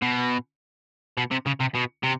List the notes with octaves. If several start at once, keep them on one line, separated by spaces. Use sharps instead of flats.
B2
B2
C3
C#3
C3
B2
C3